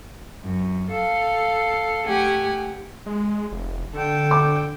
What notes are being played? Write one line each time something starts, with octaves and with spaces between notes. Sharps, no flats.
F#2
A4 F5
A3 G4 F#5 G#5
G#3
F1
D3 A4 G5
D6